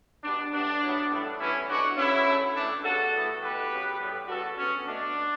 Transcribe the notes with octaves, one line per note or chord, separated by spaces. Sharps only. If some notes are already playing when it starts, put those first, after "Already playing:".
B2 G3 B3 D4
A2 G3 B3 D4
A2 F#3 B3
A2 G3 B3
A2 E3 G3 B3 C#4 E4
B2 F#3 A3 D4 F#4
C#3 F#3 B3 C#4 E4
D3 F#3 A3
A2 E3 A3 D4
C#3 G3 B3 F#4 A4
A2 E3 B3
B2 A3 G4 B4
C#3 F#3 B3
A2 G3 B3
C#3 G3 B3 F#4 A4
D3 F#3 B3 C#4
B2 A3 D4